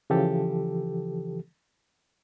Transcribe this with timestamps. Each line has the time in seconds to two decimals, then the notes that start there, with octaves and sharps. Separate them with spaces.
0.10 C#3 E3 F3 G4 A4